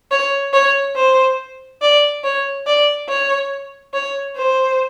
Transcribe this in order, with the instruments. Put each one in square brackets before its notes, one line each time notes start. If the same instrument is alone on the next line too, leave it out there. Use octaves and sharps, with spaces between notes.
[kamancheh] C#5
C#5
C5
D5
C#5
D5
C#5
C#5
C5